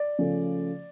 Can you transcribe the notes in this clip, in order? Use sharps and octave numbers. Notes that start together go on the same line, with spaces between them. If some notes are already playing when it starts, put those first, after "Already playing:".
Already playing: D5
C#3 F3 A3